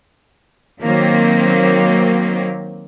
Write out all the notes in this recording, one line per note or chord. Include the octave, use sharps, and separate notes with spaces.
D#3 F#3 A#3 C4